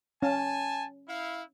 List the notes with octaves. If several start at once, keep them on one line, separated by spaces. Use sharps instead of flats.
C#4 G#5 A5
E4 F5